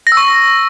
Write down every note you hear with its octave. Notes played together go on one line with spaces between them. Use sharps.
A#6
E6
C#6